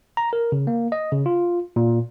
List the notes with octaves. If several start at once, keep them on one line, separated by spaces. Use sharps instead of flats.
A#5
A#4
C#3
A#3
D#5
C#3
F4
A#2